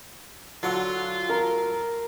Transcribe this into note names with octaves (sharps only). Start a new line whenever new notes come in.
D3 F#3 F4 F#5
A#4